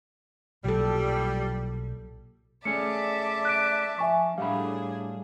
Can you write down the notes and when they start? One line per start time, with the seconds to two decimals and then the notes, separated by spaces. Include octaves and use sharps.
0.64 B1 A#2 F#3 G3 A4
2.65 A3 C#4 G#4 D5 E5 A5 D6 C#7
3.45 F#6 D7
3.99 F3 E5 G#5 C#6
4.38 A2 G3 D4 G#4 F5 F#5 B5